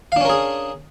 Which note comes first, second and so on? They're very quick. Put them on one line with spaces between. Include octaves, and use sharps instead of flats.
F5 D4 C#4 A#4 G#4